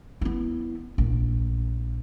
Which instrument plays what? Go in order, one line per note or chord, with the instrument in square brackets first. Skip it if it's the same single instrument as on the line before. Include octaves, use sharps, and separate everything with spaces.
[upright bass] B3 E4
A#1